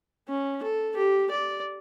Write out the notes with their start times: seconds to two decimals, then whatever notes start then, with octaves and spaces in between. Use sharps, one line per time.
0.28 C#4
0.63 A4
0.97 G4
1.31 D5